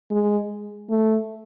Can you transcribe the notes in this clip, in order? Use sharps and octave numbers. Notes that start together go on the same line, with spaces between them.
G#3
A3